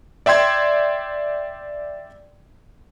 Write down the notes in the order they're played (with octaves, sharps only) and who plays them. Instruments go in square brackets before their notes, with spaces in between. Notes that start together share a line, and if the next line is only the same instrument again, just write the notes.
[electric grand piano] D5 E5 G5 C6 G#6